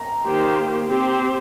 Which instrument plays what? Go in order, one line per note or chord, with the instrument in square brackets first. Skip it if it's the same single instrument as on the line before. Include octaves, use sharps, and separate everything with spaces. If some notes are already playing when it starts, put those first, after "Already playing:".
Already playing: [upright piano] A#5
[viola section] D#3 A#3 G4 C5
C4 G4 C5